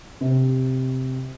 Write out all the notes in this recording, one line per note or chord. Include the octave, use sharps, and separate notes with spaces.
C3